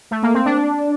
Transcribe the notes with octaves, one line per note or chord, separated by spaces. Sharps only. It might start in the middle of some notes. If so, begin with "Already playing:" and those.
A3
A#3
C4
D4